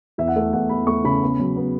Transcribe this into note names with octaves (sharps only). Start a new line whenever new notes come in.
E2 E5
F#5
A3 E5
E2 F#5
E2 B5
A3 C#6
C#3 B5
B3
F#3
B3